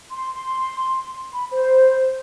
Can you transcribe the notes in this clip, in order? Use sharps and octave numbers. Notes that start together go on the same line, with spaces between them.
C6
B5
C5